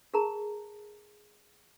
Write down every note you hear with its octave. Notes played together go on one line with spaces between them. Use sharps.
G#4 A#4 A5 A#5